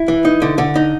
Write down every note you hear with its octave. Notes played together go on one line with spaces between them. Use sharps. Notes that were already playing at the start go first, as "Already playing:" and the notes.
Already playing: E4
E3
D#4
D3
D3
D#4